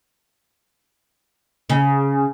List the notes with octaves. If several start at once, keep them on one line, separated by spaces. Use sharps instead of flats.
C#3